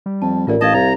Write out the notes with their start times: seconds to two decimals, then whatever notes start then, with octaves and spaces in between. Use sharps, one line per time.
0.06 G3
0.22 F2 A5
0.47 A1 A2 F4 A#4 D5
0.61 A1 D#5 F5 A5 G#6 A6
0.74 C2 A#5